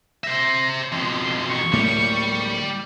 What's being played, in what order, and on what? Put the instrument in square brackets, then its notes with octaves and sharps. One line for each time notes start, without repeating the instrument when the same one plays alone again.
[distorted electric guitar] C5 E5 [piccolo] A#6
[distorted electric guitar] F2 B2 [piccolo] C6
[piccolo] C#6
[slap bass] D1 A2 A#3 [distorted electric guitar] G3